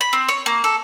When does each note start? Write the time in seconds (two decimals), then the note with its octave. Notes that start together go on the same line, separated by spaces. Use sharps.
0.01 B5
0.13 C4
0.28 C#5
0.46 A#3
0.64 A4